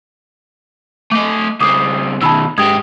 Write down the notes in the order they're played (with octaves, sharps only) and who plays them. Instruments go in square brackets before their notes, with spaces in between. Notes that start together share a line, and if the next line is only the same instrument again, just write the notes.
[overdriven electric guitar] A3 D#5 [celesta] D6
[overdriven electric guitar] C#2 C4 [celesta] D6 D#6
[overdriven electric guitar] B2 D#3 [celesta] A5 B5 E6
[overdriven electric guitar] G#2 G4 [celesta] D#6 G#6